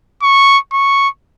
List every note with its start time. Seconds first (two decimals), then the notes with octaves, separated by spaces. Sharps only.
0.22 C#6
0.73 C#6